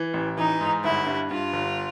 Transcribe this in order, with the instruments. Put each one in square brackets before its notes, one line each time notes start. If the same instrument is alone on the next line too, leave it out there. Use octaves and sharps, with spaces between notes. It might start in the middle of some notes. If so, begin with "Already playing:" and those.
Already playing: [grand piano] E3
A1
[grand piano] E3 [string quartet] D#4
[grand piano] G#2
[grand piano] G1 [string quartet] E4
[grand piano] G2
[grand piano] G2 [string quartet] F4
[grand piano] G1